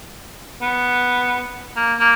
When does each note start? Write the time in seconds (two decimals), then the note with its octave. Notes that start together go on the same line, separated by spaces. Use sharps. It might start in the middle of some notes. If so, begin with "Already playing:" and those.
0.61 B3
1.76 A#3
2.00 A#3